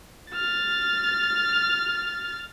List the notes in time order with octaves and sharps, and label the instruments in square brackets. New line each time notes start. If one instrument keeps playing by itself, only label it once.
[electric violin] F6 A6